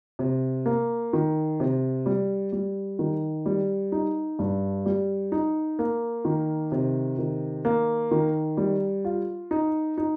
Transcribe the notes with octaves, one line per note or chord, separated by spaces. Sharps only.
C3
A#3
D#3
C3
G3
G3
D#3
G3
D#4
G2
G3
D#4
A#3
D#3
C3
D#3
A#3
D#3
G3
F4
D#4
D#4